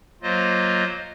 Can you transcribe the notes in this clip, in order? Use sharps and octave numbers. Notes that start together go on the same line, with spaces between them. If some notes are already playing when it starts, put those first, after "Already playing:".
F#3 A#3 F4 C5 D#5